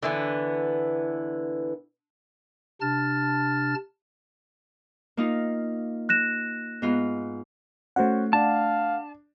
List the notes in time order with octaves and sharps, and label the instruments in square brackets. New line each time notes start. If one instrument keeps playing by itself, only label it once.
[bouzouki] D3 E3 B3
[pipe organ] C3 D4 A5 F6 A6
[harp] A#3 D#4 F4
[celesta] F#6 A#6 E7
[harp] G#2 B3 F4
[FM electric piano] A3 F#5 [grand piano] C#4 F#4 C5
[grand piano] D4 [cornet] F5 [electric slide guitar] A5